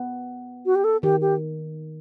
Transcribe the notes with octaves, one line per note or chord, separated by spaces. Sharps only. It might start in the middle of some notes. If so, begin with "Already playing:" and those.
Already playing: B3
F#4
G4
A4
D#3 G4
G4